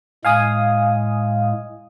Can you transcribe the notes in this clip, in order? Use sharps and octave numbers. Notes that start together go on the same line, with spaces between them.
A2 G#3 F5 G#5 D#6